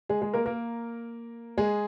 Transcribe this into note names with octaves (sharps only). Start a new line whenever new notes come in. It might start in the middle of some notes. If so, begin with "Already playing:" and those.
G#3 G#4
G#3 G#4
A#3 A#4
A#3 A#4
G#3 G#4